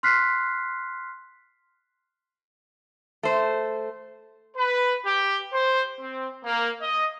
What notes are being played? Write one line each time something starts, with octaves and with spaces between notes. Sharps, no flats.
C6 F6 F#6 B6 C7
A3 C5
B4
G4
C5
C4
A#3
D#5